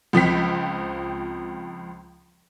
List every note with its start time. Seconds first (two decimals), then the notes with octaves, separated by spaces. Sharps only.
0.13 C#2 F3 C4 B6